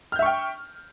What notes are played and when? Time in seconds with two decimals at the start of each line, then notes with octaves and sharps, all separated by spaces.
0.12 F6
0.16 G6
0.19 E5
0.22 C#6
0.26 G5